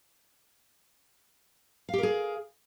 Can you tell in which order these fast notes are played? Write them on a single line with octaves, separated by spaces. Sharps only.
F5 G4 A#4 G#4